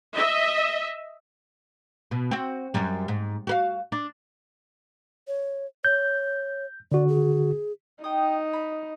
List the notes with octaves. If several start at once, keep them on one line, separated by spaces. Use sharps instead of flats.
D#5 E5
B2
C4 F#4
F#2 G3
G#2
F#4 B4 F5
D4
C#5
C#5 G6
D3 F#4 D5
G#4
D#4 G5 D#6
B5